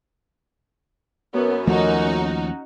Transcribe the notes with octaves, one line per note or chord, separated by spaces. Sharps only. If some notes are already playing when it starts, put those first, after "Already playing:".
F#2 B3
D#2 F3 A3 C#4 D#4 F#4